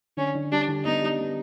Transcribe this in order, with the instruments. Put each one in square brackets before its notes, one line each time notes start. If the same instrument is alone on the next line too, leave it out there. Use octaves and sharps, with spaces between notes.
[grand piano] D3 [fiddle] C#4
[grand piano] D3
[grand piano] G3 [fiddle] D4
[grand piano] D3
[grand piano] B3 [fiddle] D#4
[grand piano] G3
B3